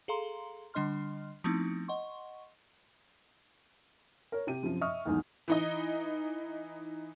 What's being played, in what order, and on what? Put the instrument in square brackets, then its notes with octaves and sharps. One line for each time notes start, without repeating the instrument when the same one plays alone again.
[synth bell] G#4 A4 F5 A#5 C6
D3 G3 D4 D#5 C6 F6
F3 A3 B3 C4 D#4 E4
D#5 F#5 C6 C#6
[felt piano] A#4 C#5
C3 G4 D#7
F#2 C3 F3
D#5 E5 C#6 D#6 F6
B1 E2 G#2 D#3
[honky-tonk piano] E3 D#4 D#5